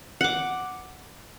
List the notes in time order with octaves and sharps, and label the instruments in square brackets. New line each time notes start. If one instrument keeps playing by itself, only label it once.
[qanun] F#5 D6